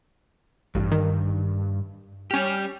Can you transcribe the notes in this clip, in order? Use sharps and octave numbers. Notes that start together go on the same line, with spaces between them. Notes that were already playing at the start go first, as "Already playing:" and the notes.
A1 G2
D#3
G3 C#4 G4 F6